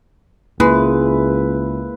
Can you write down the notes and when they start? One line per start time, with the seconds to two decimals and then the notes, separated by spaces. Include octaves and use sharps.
0.60 C#2 G#3 A#3 E4 B4